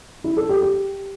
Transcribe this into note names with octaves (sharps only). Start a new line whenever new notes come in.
E4
A4
G4
G4